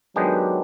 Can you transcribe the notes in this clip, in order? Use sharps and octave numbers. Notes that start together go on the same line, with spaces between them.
D#3 F#3 G#3 B3 D4 G4